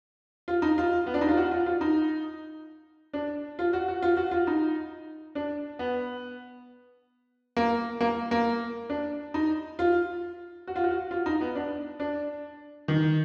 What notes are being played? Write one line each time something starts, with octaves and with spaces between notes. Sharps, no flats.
F4
D#4
F4
B3
D4
D#4
F4
F#4
F4
F4
D#4
D4
F4
F#4
F#4
F4
F#4
F4
D#4
D4
B3
A#3
A#3
A#3
D4
D#4
F4
F#4
F4
F#4
F4
D#4
B3
D4
D4
D#3